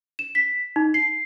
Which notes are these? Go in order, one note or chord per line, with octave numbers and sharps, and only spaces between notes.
E7
B6
D#4
C7